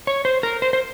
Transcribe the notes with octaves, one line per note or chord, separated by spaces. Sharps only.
C#5
C5
A#4
C5
C5